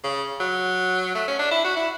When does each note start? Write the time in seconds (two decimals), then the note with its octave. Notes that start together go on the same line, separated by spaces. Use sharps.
0.04 C#3
0.40 F#3
1.15 A3
1.28 C#4
1.39 D4
1.51 E4
1.64 F#4
1.77 E4